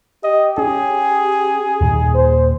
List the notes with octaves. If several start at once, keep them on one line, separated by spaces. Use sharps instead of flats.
G4 D#5
C#4 G#4
D#2 A#2 D#3
C5